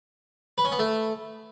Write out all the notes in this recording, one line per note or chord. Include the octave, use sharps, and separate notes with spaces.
B4
C#4
B3
A3